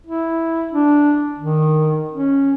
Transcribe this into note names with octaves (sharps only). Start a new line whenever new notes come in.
E4
D4
D#3
C#4